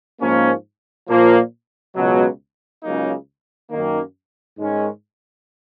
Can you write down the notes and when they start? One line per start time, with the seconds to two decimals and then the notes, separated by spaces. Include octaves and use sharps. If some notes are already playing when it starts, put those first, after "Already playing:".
0.21 G#2 F3 A#3 C#4
1.09 A#2 F3 A#3
1.95 C#2 B2 F#3
2.83 C#2 C#3 F#3 A#3 D#4
3.70 F#2 D#3 A#3
4.58 G#2 D#3 G#3 C#4